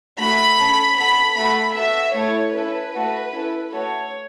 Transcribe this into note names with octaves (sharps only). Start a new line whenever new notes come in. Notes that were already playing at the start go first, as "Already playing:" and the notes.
A3 F#4 A4 B5
C#4 A4
B3 A4 B5
A3 F#4 A4 B5
B3 F#4 A4 E5
A3 E4 A4 C#5
C#4 E4 A4 B4
A3 F#4 A4
C#4 E4 A4
A3 F#4 A4 C#5